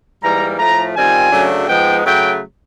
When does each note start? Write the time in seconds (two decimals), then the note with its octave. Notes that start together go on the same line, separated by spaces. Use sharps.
0.22 G#2 E3 G3 A#3 A#5
0.59 A2 F3 A3 A#5
0.95 D#3 G3 C4 F4 G#5
1.32 F#2 C#3 F#3 A3 D4
1.68 F3 G#3 B3 D#4 G5
2.05 C#3 F#3 A3 G5